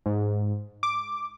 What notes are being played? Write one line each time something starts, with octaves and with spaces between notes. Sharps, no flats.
G#2
D6